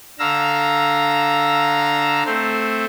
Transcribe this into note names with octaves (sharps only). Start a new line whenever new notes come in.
D3 F5 A#5 E6
A3 C4 C5